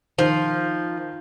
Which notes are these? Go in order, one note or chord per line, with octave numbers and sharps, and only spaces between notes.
D#3 F3